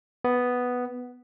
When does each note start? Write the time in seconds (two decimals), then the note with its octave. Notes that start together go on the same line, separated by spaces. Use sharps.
0.24 B3